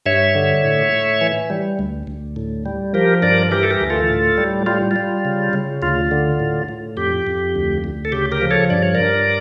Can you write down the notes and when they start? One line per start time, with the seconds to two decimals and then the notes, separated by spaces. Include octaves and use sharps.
0.06 G2 C#5 E5
0.35 D3
0.64 A2
0.92 A2
1.21 E3
1.50 G3
1.79 D2
2.07 D2
2.36 A2
2.66 G3
2.94 F3 G4 A#4
3.22 G2 A#4 D5
3.51 E3 G4 A#4
3.63 A4
3.71 G4 A#4
3.81 D2
3.90 F4 A4
4.10 A2
4.38 G3
4.66 G3 F4
4.91 F4
4.96 G3
5.25 C#3
5.53 C#3
5.82 D2 F4
6.11 D3
6.40 A2
6.69 A2
6.97 F2 G4
7.27 F2
7.55 D2
7.84 D2
8.05 A4
8.12 C#3 G4
8.32 G4 A#4
8.41 F3
8.51 A4 C#5
8.70 G2 D5
8.82 C#5
8.95 G2 A#4 D5